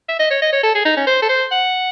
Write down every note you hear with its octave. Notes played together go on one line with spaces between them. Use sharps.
E5
D#5
C#5
D#5
C#5
A4
G#4
D#4
C#4
C5
A4
C5
F#5